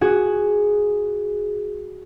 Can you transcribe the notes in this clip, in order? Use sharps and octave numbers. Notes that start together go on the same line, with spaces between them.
F#4 G#4